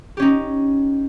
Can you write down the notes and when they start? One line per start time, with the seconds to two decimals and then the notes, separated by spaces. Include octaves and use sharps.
0.17 G4
0.20 C#4
0.22 D#4